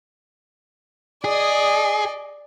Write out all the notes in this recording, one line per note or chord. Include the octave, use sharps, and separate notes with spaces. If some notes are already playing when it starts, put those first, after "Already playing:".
G#4 D5 D#5